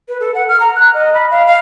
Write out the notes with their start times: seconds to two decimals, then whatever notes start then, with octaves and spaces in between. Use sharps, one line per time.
0.08 B4
0.20 A4
0.35 F#5
0.48 F6
0.60 A#5
0.76 F#6
0.94 D#5
1.14 B5
1.31 F5
1.47 F5